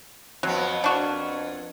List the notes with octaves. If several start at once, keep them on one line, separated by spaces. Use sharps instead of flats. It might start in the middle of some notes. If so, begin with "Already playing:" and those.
F2 F#3 B3
D4 F#4 A#4